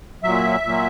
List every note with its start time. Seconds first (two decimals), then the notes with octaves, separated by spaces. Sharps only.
0.23 A#2 F#3 E5
0.64 A#2 F#3